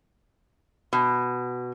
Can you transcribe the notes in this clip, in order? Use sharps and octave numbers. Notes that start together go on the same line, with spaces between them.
B2